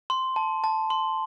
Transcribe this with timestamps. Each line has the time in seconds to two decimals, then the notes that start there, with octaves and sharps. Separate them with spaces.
0.10 C6
0.36 A5
0.64 A5
0.90 C6